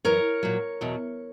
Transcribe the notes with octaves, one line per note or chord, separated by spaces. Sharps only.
F#2 E3 A#4 C#5
A#2 F#3
E2 B2 F#3